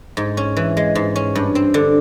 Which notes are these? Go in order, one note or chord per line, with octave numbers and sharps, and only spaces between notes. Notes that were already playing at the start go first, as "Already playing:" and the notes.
G#2
C#4
E3
G#3
G#2
C#4
G2
C4
D3